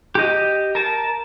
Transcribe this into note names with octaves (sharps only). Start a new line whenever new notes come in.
G4 D#5
A#4 A5